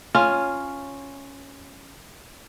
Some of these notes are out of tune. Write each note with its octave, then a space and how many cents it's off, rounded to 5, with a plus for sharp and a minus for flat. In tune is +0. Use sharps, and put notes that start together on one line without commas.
C#4 +0 F4 +0